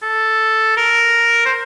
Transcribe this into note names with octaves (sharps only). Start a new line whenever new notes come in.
A4
A#4
C5